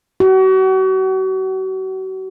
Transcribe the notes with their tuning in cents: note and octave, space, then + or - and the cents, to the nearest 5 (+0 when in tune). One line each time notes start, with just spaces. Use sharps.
F#4 +40